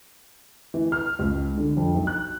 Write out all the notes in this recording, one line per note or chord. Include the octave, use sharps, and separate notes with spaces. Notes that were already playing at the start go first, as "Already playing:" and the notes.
E3
F6
C#2
D3
F2
B1
F#6